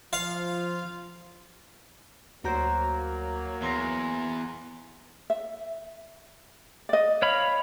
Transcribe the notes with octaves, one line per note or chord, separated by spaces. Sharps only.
F3 F4 F5
D2 F#3 A#3 F#4 A#4 C5 A#5 G6
E2 A#5 C6 A#6
E5
D5 D#5
C#5 F5 B5